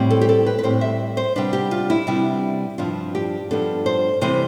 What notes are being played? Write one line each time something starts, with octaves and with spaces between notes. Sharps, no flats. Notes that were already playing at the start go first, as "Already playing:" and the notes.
Already playing: A2 G3 C4
A4
G4
A4
B4
B4
A2 G3 C4 C5
E5
C5
C3 G3 B3 D4 B4
G4
F4
E4
C3 G3 B3 D4
G2 F3 B3 D4 F4
G4
G2 F3 B3 D4 A4
C5
C3 E3 G3 C4 C5